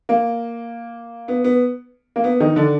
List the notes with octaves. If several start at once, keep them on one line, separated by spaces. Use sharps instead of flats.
A#3
B3
B3
A#3
B3
D#3 D#4
D3 D4